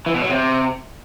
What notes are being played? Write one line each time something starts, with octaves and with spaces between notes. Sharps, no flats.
E3
B2
F#3
C3